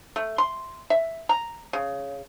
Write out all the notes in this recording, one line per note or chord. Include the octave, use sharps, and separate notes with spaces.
A3
C6
E5
A#5
C#3